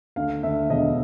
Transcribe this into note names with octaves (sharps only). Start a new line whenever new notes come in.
D2 F5
D2 E5
E1 D#5